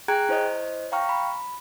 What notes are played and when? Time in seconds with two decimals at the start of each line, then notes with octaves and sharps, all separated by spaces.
0.08 G#4 G5 A#5 F#6 G#6 D7
0.29 E4 C5 C#5 D#5
0.92 F5 G5 A#5 C#6 F6
1.09 B5